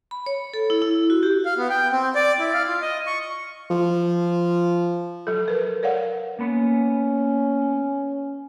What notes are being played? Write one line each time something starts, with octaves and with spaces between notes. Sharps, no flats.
B5
C#5
A4
E4
E4
F#4
G4
F5
B3
G5
C4
D5
E4
F5
F4
D#5
C#6
F3
F#3 A4
A#4 B4
A#4 C#5 D5 F5 F#5
A#3 B3 C#4 B5